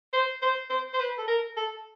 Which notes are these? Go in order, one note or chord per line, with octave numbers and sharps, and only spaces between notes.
C5
C5
C5
C5
B4
A4
A#4
A4